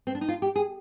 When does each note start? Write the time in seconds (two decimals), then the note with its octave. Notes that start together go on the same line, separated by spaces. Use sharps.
0.07 C4
0.15 D4
0.21 D#4
0.29 F4
0.42 G4
0.56 G#4